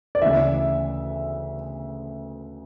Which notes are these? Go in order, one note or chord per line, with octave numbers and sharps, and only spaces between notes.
D5
D2 C#3 E3 E5